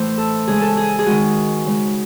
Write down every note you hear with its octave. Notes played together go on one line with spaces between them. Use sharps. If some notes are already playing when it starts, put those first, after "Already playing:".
Already playing: A2 E3 A3 C5
A4
C#3 G#3 G#4
A4
G#4
G#4
D#3 G#3 F#4
C#3 G#3